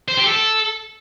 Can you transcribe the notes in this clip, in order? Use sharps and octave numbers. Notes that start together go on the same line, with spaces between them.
C5
G4
A4